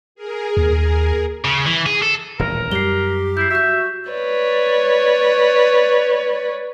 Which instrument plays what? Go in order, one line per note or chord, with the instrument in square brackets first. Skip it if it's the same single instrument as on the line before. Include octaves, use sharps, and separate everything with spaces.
[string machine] G#4 A#4
[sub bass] D#2
[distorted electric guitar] C#3
E3
G#4
A4
[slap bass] D#1 A1 D2 [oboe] A#4
[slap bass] F#2 G3 [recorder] G4 [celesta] C7 G7
[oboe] E4 [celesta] G6 C7
[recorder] F#4 [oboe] E5 [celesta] G6 B6
[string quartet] B4 C#5 D5